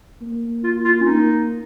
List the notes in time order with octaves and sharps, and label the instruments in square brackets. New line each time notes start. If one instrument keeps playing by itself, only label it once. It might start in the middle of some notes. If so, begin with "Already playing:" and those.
[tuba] A#3
[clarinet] F4
F4
C#4
[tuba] A#3 [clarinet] D#4